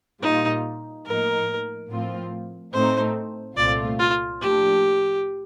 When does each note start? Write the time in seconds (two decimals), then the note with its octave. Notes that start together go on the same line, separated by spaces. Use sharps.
0.22 A#2 G3 A#3 D#4 F4
1.06 A2 F3 A#3 D#4 A#4
1.90 A2 F3 C4 F4
2.73 A2 A3 C4 D#4 C5
3.57 C2 A#2 A3 C4 F4 D5
3.99 F4
4.41 A2 F3 A#3 D4 G4